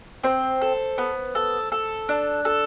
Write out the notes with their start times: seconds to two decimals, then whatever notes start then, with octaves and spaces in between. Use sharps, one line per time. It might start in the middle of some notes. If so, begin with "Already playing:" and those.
0.24 C4 C5
0.62 A4
0.98 B3
1.35 A4
1.72 A4
2.09 D4
2.45 A4